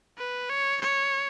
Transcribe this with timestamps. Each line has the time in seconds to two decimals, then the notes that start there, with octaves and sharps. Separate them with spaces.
0.18 B4
0.49 C#5
0.81 C#5